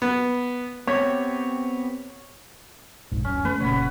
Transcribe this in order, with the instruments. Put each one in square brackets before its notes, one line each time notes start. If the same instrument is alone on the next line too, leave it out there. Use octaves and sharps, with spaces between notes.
[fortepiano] B3
[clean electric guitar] B3 C4 G4 [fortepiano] C#5
[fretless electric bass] A#1 G#2
[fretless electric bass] D1 F#2 [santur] C#4
[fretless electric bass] F3 A3 [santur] B4
[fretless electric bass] F1 A#2 C#3 [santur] C#5 F#5 B5